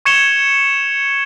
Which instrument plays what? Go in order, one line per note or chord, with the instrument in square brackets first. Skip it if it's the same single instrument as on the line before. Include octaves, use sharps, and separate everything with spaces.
[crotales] C#6 G#6 C#7 E7 F7 G7